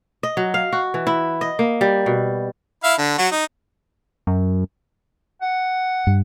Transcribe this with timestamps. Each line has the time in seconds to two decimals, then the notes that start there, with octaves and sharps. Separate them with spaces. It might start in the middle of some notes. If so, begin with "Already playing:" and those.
0.23 D#5
0.37 F#3
0.54 F5
0.73 F#4
0.94 E3
1.07 E4
1.41 D#5
1.59 A#3
1.81 G3
2.06 B2
2.84 E4 E5 F5
2.98 D3
3.18 F#3 F#4
3.31 D#4
4.27 F#2
5.42 F#5
6.07 G2